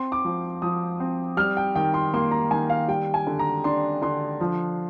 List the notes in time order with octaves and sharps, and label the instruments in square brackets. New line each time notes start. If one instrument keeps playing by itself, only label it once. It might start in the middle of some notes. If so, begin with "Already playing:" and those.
Already playing: [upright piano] C4 C6
D6
F3
F3 D#6
C4
G3 F6
G5
D#3 G5
C6
A#3 C6
A#5
D#3 G#5
F5
G3 G5
G#5
D3
A#5
D4 C6
D3 C6
F3